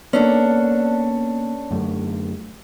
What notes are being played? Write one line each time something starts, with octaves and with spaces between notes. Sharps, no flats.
A#3 B3 C#4 D4 A4
F#2 D3 A3